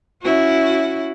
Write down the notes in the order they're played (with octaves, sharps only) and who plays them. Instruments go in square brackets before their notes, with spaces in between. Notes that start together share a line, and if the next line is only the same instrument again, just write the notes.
[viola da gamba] C#4 E4 F#4